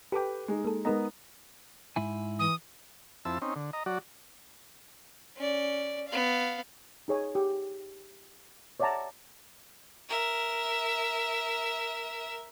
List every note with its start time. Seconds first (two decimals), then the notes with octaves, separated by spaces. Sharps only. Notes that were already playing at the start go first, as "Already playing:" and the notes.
0.12 G4 A4 B4 G5 D6
0.48 G#3 D#4
0.65 A#3 A4
0.85 G#3 B3 D#4 A#4 D#5 A#5
1.96 G#2 E4 G#5
2.39 E3 D#6
3.25 F2 C4 E4 A5 E6
3.42 C4 C#4 D#4
3.56 D3
3.73 D#5 A#5
3.86 F#3 F#4 D5
5.37 C#4 D5
6.08 B3 F5
7.08 D#4 G#4 C#5 G#5
7.35 G4
8.80 C#5 D5 E5 F#5 A5 A#5
10.09 A#4 E5